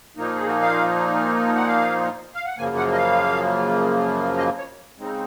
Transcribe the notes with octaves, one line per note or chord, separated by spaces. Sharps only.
A#2 F3 A#3 D#4
G#4
F#4
F5
F#5
F5
F5
F#5
F#2 C#3 F3 A#3 G#5
F#5
D#5
F5
D#5
C#5
C#3 G#3 C4 D#4